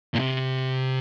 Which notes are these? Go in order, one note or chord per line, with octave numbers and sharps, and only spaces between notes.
A#2
C3